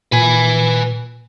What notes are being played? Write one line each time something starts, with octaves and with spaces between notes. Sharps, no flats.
A#2 B4 G#5